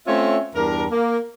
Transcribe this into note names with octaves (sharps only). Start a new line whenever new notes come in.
A3 C4 C#4 F4 C#5 E5
E2 G2 D4 A#4
A#3